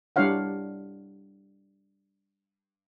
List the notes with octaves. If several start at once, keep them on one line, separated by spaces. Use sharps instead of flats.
G3 D4 E4 C#5 F5 F#5